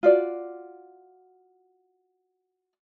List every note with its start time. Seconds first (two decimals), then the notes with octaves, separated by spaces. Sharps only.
0.03 F4 F#4 D5